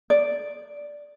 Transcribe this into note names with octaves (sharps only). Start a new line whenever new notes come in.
D5